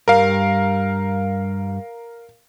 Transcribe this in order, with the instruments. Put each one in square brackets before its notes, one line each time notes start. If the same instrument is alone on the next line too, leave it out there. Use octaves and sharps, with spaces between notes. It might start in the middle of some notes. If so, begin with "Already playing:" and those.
[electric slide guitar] G2 G3 [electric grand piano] A#4 F5